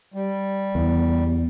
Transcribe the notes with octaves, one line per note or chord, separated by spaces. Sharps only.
G3
E2